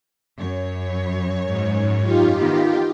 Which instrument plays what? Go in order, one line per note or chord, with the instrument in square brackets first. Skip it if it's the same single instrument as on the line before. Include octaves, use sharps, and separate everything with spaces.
[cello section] F#2 C#5
[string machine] G#2
D#4 F4 G4
[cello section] D#3 E3 B3